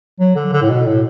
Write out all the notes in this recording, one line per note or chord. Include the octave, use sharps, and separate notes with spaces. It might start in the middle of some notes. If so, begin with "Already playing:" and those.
F#3
D3
D3
A2
B2
A2